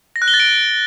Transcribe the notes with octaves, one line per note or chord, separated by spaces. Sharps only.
A#6
F#6
G7
A6
D7